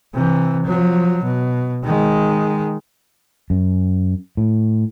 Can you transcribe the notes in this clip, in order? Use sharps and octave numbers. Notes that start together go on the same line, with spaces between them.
C3 E3
F3 F#3
B2
D#3 G#3
F#2
A2